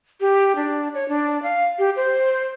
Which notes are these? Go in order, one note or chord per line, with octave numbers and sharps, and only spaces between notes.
G4
D4
C#5
D4
F5
G4
C5